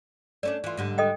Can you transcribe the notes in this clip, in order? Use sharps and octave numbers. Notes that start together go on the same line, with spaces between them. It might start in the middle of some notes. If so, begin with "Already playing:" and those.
A3 C#4 D4 D5
E3 F4
G#2 D3 G3
A4 D#5 G5